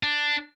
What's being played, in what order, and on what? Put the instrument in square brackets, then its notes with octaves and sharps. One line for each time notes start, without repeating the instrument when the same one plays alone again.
[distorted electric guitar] D4